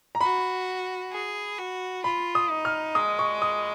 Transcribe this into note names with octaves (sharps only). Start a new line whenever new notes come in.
A#5
F#4 B5
G#4
F#4
F4 B5
D#6
D#4
F6
G#3 D#6
C#6
D#6